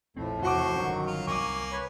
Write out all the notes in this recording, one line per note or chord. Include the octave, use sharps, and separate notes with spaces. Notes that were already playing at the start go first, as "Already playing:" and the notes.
A#1 F2 A2 A3 C4
E2 C3 F#4 C5 F#5 C#6 D6
G1 G2 D#3 F#3 C#4
F4
C2 A#3 G#5 C#6 D6
B4 C#5